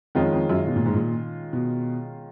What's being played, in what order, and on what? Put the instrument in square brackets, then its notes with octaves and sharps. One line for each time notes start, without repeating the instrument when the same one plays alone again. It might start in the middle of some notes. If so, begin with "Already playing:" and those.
[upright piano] F2 [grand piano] D#3 G#3 C#4 F4
[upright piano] F2
F#2
B2
A#2
G#2
A#2
B2